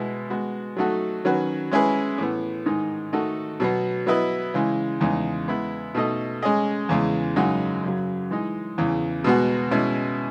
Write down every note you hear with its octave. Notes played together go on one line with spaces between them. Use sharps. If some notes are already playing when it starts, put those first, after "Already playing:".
Already playing: B2 G#3 B3 E4
G#3 B3 F#4
F#3 A3 D#4 F#4 A4
D#3 F#3 C#4 F#4 B4
G#3 C#4 E4 G#4 B4
A2 E3 B3
G#2 D#3 G#3 D#4
D#3 A3 D#4 F#4 A4
B2 F#3 B3
F#3 B3 E4 B4 D#5
C#3 E3 G#3
E2 C#3 G#3 D#4
G#3 B3 E4 B4
B2 A3 D#4 A4 D#5
G#3 C#4 G#4 D#5
E2 C#3 E3 G#3
F#2 C#3 G#3 D#4 F#4
F#2 C#3 F#3
E3 G#3 D#4
E2 C#3 E3
B2 G#3 B3 F#4
B2 G#3 C#4 E4